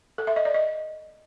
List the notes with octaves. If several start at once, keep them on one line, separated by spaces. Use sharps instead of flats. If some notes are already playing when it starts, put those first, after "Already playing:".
A4
E5
D#5
D5
D#5